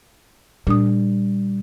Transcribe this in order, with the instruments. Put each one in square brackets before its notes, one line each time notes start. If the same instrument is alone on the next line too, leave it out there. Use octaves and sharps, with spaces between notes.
[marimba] A#2 D4 D#6 [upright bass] G3